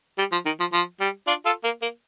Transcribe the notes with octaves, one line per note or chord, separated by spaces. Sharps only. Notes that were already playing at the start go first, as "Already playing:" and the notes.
G3
F3
D#3
F3
F3
G3
D4 F4
F4 A4
A#3
A#3